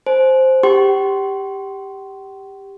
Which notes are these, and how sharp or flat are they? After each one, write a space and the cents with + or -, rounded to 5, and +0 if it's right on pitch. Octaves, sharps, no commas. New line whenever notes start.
C5 +0 G#5 +40
G4 +10 G5 -45 C6 -5